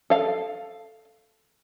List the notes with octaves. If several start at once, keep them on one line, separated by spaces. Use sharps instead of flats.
A4 F5